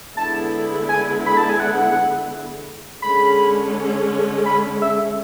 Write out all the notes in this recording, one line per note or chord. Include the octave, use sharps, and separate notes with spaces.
D3 G#3 B3 E4 G#4 A5
G#5
B5
A5
G#5
F#5
D3 G#3 C#4 B5
B5
E5